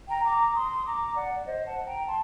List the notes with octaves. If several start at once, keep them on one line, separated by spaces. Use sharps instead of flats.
G5 A#5
A#5 D6
C6 D#6
A#5 D6
D5 F#5
D5
C5 D#5
F#5 A5
A5
G5 A#5
A5 C6